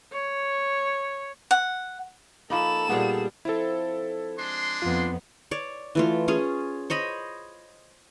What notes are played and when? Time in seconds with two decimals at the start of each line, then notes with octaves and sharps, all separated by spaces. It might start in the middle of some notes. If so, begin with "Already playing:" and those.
0.13 C#5
1.51 F#5
2.50 F3 A#3 D#4 A4 B5 E7
2.89 A#2 G3 B3 G#4
3.45 F3 C4 E4 A4
4.39 G#3 D4 A5 C6
4.82 F2 B3 F4
5.51 C#5 D5
5.95 E3 A3 F4
6.28 C#4 F4 G#4 C#5
6.90 C5 C#5 D#5 B5